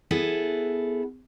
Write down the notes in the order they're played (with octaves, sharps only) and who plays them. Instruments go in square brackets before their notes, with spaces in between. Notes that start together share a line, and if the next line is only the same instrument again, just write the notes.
[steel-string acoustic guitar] B3 E4 G#4 A4